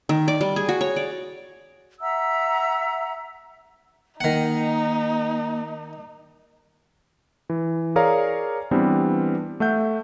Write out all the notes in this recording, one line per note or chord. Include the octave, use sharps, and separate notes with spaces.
D#3
D5
G3
G#4
F#4
C#5
D5
E5 F#5 A#5 E6
D#3 A#3 D#4 F#5
E3
G#4 A#4 C#5 D5 F5 A#5
E3 G3 B3 C4 D4
A3 E5 F#5 G6